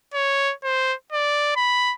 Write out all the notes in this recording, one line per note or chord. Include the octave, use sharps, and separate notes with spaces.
C#5
C5
D5
B5